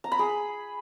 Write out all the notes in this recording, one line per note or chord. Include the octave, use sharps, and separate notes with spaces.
A#5
B5
G#4